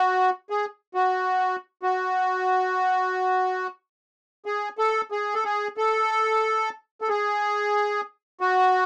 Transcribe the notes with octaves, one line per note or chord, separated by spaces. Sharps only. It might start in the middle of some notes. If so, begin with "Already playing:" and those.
Already playing: F#4
G#4
F#4
F#4
G#4
A4
G#4
A4
G#4
A4
A4
G#4
F#4